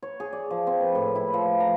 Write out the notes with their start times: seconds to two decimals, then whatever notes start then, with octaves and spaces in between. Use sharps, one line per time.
0.03 C#5
0.20 G#4
0.33 D5
0.51 F3
0.67 C4
0.80 B4
0.95 A2
1.16 E4
1.34 F3
1.60 A#5